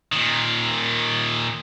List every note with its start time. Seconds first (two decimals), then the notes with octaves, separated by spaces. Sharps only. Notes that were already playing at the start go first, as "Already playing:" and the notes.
0.12 A#2 D#3